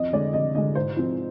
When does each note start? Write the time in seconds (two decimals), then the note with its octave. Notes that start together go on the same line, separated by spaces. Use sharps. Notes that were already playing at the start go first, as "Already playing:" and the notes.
Already playing: F2 D#5
0.13 D3 G#3 D5
0.33 F2 D#5
0.55 D3 G#3 D#5
0.75 G#2 C5
0.97 F3 C4